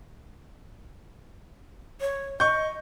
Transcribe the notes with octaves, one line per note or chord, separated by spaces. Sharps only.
C#5
D#5 C#6 G6